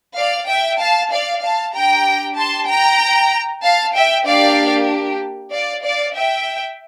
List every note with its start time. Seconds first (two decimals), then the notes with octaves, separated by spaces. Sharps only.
0.16 D5 F5
0.48 E5 G5
0.79 F5 A5
1.11 D5 F5
1.42 F5 A5
1.73 D4 G4 G5 A#5
2.37 A5 C6
2.68 G5 A#5
3.63 F5 A5
3.94 E5 G5
4.25 A#3 D4 G4 D5 F5
5.52 D5 F5
5.84 D5 F5
6.15 E5 G5